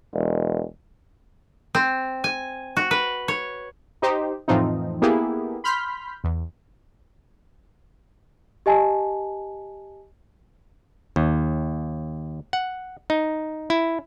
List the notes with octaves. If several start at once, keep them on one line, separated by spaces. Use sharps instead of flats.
E1
C4
G#5
F#4
B4
C#5
D#4 G4 C5
F2 A2 E3 F3 C4 D#4
A#3 B3 E4 G4 G#4
B5 C6 F6 G6 B6
E2
G4 D#5 G#5 A5
D#2
F#5
D#4
E4